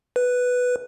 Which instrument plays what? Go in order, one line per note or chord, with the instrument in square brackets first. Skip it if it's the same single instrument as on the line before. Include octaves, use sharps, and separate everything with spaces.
[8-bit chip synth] B4